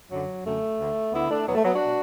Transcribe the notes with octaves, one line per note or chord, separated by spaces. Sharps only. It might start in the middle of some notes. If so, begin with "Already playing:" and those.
F#2 D3 F#3
F#2 D3 A3
D2 D3
D2 D3 B3 E4
A3 D4
E2 B2 F#3 B3
A3
F#3 B3
D4 F#4
B2